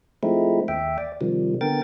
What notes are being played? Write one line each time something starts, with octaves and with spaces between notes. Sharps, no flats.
F3 G#3 A3 C4 D#4 E4
D#2 E5 G5
D5
C3 D#3 F3 G3
D3 B3 A#4 G5 A6